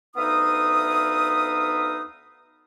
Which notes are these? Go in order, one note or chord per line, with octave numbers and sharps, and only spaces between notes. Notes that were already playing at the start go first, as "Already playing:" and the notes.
D2 B3 D#4 E5 F5 D#6